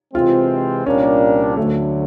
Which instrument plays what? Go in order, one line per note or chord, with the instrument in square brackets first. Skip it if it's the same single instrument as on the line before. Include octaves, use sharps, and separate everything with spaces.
[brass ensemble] C3 E3 G#3 C4 [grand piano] F4
[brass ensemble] C2 A#2 G3 A#3 D4 [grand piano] C#4
[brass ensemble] D2 D3 F#3 [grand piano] A3